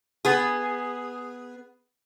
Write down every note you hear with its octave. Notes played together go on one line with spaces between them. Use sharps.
B3 G#4